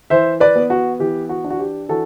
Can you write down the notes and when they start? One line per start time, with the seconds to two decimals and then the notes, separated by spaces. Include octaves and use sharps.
0.10 E3 C5 E5
0.40 B4 D5
0.56 B3
0.70 F#4
0.99 E3 G4
1.29 F#4
1.44 D4
1.50 F#4
1.59 G4
1.89 E3 F#4 A4